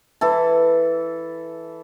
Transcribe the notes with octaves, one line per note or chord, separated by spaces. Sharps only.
E3 E4 A4